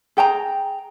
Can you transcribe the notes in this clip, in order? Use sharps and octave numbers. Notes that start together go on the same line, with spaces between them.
G#4 G5 A5 A#5